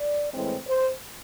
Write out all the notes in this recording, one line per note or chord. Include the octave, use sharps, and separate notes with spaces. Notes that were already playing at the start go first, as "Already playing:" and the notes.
Already playing: D5
A2 E3 G#3 C4
C5